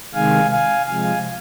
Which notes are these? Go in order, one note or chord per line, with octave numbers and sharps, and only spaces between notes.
C3 D#3 G#3 F5 G#5
F5 G#5
C3 F3 G#3 F5 G#5